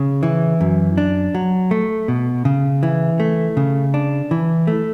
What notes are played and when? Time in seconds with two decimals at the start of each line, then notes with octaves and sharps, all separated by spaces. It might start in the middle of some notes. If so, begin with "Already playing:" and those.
Already playing: C#3
0.23 E3
0.61 F#2
0.98 D4
1.35 F#3
1.71 A3
2.08 B2
2.45 C#3
2.83 E3
3.20 A3
3.57 C#3
3.94 D4
4.31 E3
4.67 A3